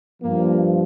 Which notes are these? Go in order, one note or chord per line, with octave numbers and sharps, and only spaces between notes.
G2 F3 A#3